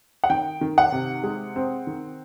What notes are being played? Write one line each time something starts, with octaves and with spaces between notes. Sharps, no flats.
F#5
D#3 G5
D#3
F#5
C3
G#3
C4
D#3